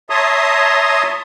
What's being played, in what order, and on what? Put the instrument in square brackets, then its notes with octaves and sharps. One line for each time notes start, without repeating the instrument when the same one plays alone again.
[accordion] C#5 E5 A5 A#5 C6 D#6